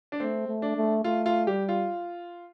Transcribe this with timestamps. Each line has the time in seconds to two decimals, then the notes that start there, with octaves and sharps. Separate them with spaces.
0.12 D4
0.20 A3 C4
0.48 A3
0.62 D4
0.77 A3
1.04 A3 F4
1.26 F4
1.47 G3 G4
1.69 F4